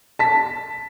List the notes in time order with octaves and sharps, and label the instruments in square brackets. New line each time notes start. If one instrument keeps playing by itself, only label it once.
[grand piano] A5 B6